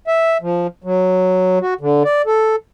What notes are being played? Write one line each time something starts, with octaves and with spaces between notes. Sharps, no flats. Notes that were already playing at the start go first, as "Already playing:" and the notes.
E5
F3
F#3
F#4
D3
D5
A4